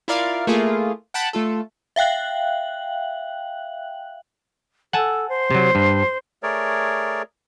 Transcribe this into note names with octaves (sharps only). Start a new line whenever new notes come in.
E4 F4 A#4 D5 F5
A3 A#3 E4 F4 G#4
F#5 G5 A5 B5 F#6
A3 F4 A4
E5 F5 G5 F#6 F#7
A4 F#5 G#5 A5
C5
C3 F#3
G2
A3 G#4 A#4 C#5 D5